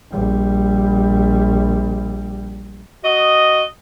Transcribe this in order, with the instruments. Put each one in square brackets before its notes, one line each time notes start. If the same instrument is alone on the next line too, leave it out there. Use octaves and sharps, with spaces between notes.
[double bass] A#1 G3
[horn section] F#4 D#5